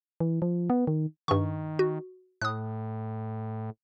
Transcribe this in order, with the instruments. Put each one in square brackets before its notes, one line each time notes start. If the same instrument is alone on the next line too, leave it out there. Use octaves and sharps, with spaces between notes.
[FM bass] E3
F3
B3
D#3
[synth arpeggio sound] G2 C#6 [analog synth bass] D#3
[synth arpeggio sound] F#4
[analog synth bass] A2 [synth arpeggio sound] D#6 F#6